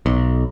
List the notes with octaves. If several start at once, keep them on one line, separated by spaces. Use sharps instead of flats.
B1